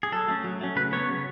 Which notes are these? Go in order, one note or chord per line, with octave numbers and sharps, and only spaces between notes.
G#4
F#3 A4
A3 C#4
F#3
A3 C#4
C#3 B4
F#3 B3 C#5
C#3